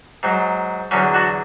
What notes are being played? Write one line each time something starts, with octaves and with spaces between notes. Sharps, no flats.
G#2 F#3
E2 D3 F#3 C#4
D4 F#4